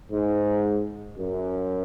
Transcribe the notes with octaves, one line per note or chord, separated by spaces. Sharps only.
G#2
F#2